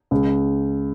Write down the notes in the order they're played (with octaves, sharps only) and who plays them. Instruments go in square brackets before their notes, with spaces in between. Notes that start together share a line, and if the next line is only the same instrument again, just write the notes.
[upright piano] C#2